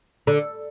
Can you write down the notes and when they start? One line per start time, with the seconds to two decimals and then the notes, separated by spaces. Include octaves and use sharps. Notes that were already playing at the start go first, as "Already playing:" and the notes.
0.27 D3